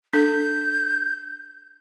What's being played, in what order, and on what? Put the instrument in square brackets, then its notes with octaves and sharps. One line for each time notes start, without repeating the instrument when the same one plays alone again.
[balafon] D4 A4 [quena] G6